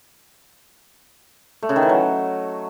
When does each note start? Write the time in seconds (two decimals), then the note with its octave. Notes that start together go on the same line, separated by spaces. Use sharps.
1.63 A3
1.69 C#3
1.76 D#3
1.83 E3
1.89 F#3